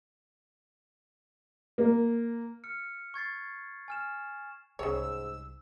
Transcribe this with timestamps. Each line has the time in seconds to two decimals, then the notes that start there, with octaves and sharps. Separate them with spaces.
1.78 A#3
2.64 F6 C#7
3.14 C#6 G#6 A6 C7
3.88 G#5 F6 E7
4.79 C2 G#2 C#3 C#5 E6